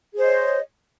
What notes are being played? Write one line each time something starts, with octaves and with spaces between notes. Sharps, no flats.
G#4 C5 C#5 D#5